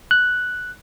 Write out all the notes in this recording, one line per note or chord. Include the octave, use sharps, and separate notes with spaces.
F#6